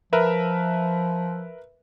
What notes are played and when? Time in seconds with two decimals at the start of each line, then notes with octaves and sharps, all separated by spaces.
0.13 F3 A#4 B4 E5